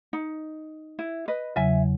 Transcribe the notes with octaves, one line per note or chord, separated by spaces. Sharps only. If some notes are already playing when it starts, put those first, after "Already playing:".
D#4
E4
B4 D#5
E2 C#3 F#3 E5 G#5